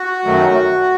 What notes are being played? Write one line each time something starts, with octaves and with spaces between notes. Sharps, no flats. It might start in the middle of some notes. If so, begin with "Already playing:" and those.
Already playing: F#4
F#2 D#3 F#3 A3